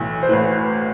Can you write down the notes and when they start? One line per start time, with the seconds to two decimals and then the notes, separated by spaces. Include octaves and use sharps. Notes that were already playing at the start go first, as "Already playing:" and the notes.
Already playing: B1 A2 E3
0.23 C5
0.29 A1 A2 E3 B4